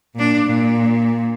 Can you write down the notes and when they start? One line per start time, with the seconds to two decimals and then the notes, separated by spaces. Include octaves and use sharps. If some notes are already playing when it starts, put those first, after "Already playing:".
0.15 A#2 D4
0.46 A#2